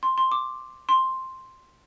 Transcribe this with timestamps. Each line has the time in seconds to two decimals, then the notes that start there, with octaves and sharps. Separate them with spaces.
0.03 C6
0.18 C6
0.32 D6
0.89 C6